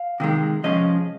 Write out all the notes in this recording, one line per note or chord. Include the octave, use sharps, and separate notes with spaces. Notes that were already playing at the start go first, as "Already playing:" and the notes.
Already playing: F5
C3 D#3 G#3
C3 F3 G#3 C#4 D#5